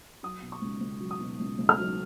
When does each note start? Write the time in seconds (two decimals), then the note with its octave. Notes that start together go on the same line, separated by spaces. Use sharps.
0.23 F#3 D#6
0.42 B2
0.52 C#6
0.62 C#2
0.81 C#2
1.00 F#3
1.11 D#6
1.20 B2
1.40 C#2
1.59 C#2
1.69 F6
1.79 F#3